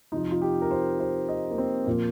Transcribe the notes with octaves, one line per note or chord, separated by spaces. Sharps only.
F2 C3 F3 D#4
F4
G4
A#4
C5
C5
D#5
A#3
C4
A#2 F3 A#3